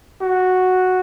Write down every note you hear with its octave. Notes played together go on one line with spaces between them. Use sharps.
F#4